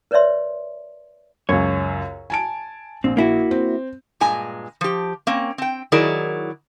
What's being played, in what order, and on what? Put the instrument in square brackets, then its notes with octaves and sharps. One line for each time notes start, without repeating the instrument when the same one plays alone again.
[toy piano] A#4 B4 C#5 D5 E5 C6
[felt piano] C#2 F#2 [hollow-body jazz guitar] C#5
[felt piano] G#5 A5 D7
[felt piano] A#1 [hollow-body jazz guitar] C4
[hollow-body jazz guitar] A#3 E4 F#4
[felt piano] C4
[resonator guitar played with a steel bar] G2 A#2 G#3 G#5 A#5
F3 G4
A#3 C4 C#4
C4 G5
D#3 F#3 E4 G#4 A#4 D5